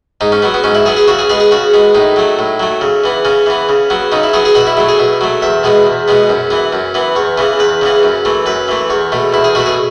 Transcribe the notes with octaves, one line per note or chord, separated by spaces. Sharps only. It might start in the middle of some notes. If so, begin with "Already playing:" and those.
G#2 D#4
C#4
F#3 B3
B3
G#2 C#4
E4
F#3 B3 G#4
G#4
C#3 F#4
G#4
G#3 B3 G#4
G#4
C#3 F#4
G#3 B3
A2 D#4
F#3 A3
A2
F#3 A3
C#3
E3 B3
C#3 C#4
E3 B3
C#3
F#3 B3
C#3 D#4
E4
F#3 B3 G#4
G#4
B2 F#4
E4
F#3 A3 E4
G#4
B2
F#3 A3
E2 E5
B2 G#3 B3
E2
B2 G#3 B3
F#2
E3 B3
F#2
E3 B3
E2 C#5
C#3 E3 B3
E2 B4
C#3 E3 B3
F#2
E3 A3
F#2 B4
E3 A3
E2 C#5
B2 A3
E2 E4
G#4
B2 A3 F#4
G#4